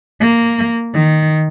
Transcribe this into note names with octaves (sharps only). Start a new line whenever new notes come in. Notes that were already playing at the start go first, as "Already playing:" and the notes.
A#3
D#3